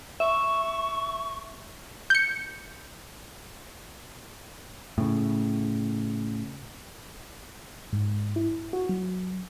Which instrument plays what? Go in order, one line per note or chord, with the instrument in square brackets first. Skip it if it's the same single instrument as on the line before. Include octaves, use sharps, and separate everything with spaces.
[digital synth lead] E5 [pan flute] C#6
[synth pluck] G6 C#7
[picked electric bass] A2 C#3
[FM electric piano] G#2
E4
F#4
F#3